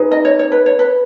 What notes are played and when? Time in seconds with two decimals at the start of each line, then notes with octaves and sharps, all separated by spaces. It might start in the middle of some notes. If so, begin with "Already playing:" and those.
Already playing: D#4 G#4 B4
0.11 D#5
0.25 C#5
0.39 C#5
0.52 B4
0.66 C#5
0.79 B4